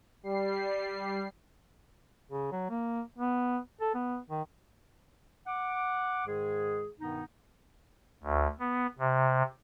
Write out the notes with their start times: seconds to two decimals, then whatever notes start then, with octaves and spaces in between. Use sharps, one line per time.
0.23 G3 C7
2.31 C#3
2.52 F#3
2.69 A#3
3.18 B3
3.81 A4
3.94 B3
4.30 D#3
5.47 F#5 D6
6.26 G#2 D#3 G#3 G#4
7.00 G2 B2 D#3 B3 D#4
8.23 D2
8.60 B3
8.99 C3